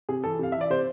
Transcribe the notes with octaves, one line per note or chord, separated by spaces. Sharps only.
C3 G#4
E3 A4
C3 F5
E3 E5
D5
C3 C5